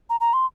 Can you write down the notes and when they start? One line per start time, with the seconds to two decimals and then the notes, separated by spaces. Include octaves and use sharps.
0.10 A#5
0.21 A#5
0.33 C6